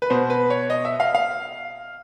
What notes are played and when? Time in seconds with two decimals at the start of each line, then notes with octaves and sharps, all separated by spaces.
0.02 B4
0.10 B2 C5
0.30 B4
0.50 C#5
0.70 D#5
0.85 E5
1.00 F5
1.15 F5